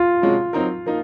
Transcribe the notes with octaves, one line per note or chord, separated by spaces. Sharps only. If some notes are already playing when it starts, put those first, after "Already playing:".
Already playing: F4
C3 F3 G#3 C#4 F#4
F#3 C4 D#4 A#4
F3 A#3 D#4